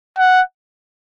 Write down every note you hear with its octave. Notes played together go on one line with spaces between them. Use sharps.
F#5